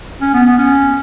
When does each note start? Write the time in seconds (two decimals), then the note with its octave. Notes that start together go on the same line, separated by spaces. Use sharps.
0.21 C#4
0.34 B3
0.46 B3
0.58 C#4